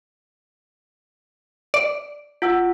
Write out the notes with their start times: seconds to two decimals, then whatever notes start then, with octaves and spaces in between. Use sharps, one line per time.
1.74 D5
2.42 F4 F#5 E6